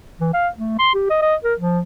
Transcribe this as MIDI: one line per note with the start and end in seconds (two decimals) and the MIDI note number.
0.20 0.30 52
0.34 0.48 77
0.57 0.75 57
0.79 0.93 84
0.94 1.07 67
1.10 1.18 75
1.22 1.35 75
1.44 1.54 70
1.60 1.81 53